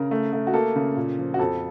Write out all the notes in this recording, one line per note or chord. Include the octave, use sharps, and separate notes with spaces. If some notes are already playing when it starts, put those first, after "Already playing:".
Already playing: C#3 A#4
A3
A3
F#4
A#3 A4
C#3
A#2
F3
F#4
F2 A4